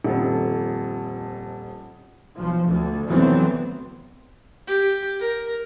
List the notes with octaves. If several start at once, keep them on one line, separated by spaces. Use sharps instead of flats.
D#1 F2
B1 F3
D2 D3
F1 D3 E3 F#3 B3 C4
G4
A#4